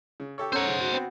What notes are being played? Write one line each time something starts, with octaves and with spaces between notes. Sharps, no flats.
C#3
G4 A4 C#5
C#4 A4 C5 C#5 F#5 A#5
C#3
F#4
B3 C4